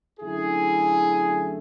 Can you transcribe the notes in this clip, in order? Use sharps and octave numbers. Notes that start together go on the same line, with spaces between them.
F#2 D3 A3 E4 G#4